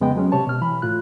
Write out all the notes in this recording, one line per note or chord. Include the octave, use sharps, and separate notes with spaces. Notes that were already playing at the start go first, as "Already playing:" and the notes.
F2 C#3 G#3 B3 D#5 G5
F#3 G#3 C#4
C3 G4 C#5 A5
B2 F6
E3 B5
A2 F4 F#6